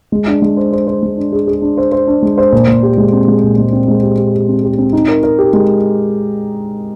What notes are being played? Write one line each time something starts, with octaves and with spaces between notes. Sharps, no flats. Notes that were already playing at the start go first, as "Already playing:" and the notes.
G#3
D4
G#3
C5
C5
C5
G#3
D4
G#4
G#4
D4
C5
C5
D4
G#3
C5
A#2
A#2
G4
G#3
C4
G#3
A#2
G#3
C4
G#3
G4
G4
G4
C4
G4
C4
D#4
A#4
A#4
G4
G#3